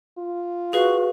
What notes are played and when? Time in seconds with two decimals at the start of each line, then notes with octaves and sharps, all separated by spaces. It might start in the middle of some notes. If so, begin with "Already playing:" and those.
0.18 F4
0.73 F#4 G#4 B4 F5